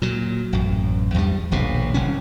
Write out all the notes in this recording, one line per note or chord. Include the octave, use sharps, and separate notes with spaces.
A#2 F#3
A1 F#2
E2 G2 F#3 G3
D#1 A#1 B2
F#1 C2 C#4